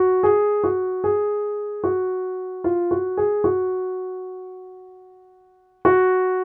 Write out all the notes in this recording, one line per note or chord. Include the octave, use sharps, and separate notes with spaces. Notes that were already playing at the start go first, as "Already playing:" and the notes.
Already playing: F#4
G#4
F#4
G#4
F#4
F4
F#4
G#4
F#4
F#4